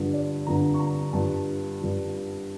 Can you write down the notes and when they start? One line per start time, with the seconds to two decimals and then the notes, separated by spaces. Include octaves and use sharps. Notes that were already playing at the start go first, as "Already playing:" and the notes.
Already playing: G2 D3 F3
0.13 D5
0.46 G2 D3 F3 A#5
0.74 C#6
0.79 A#5
1.13 G2 F3 A5
1.80 G2 F3